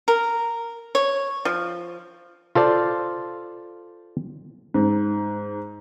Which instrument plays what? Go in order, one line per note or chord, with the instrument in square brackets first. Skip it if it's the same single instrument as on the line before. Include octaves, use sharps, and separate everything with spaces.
[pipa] A#4
C#5
F3
[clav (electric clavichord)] F4 A4 C5 D5
[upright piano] G#2